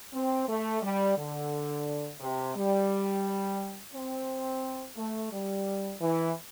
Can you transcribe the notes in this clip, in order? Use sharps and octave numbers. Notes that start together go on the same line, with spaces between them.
C4
A3
G3
D3
C3
G3
C4
A3
G3
E3